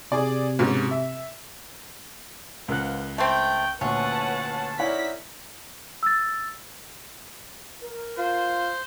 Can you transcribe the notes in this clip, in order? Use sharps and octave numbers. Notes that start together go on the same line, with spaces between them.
C3 G#4 D5
G#2 B2 C#4
E5
C#2 A#4 C5 F5 F#5 F#6
A3 C4 G5
D2 A#2 C#4 B4 C#5 F#5 A5
C4 D#4 E4 A#4 C#5 D5 F#5 B6
E6 A6
A#4
F4 C5